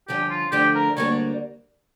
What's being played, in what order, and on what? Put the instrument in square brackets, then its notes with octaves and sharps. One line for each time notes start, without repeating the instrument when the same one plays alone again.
[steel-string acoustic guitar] G2 D3 F3 C#4 [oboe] G4
[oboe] F4
[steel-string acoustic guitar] D3 F3 A3 D4 [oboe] G4
[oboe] A#4
[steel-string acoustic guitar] D2 D3 G3 A#3 D4 [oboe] C#5